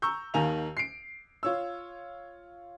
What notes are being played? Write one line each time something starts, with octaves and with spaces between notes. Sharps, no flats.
A#5 C#6 E6 G6
D#2 D#3 F5 G#5 A#5 F7
C7 D7
F4 C#5 E6